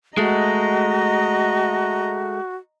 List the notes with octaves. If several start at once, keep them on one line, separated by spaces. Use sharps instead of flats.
G#3 A3 F#4 D#5 A#5